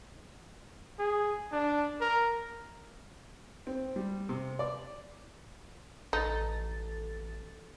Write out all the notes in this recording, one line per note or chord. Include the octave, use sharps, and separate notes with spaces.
G#4
D4
A#4
C4
G3
C3
D5
A1 D#4 A4 A6